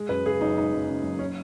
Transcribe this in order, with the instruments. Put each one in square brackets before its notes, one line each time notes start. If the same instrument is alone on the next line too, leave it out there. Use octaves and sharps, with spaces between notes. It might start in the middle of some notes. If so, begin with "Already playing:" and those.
Already playing: [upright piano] G#3
F#2 B4
C#3 G#4
F#1 D#4
G#3 D#4
F#2
C#3
F#1
C#4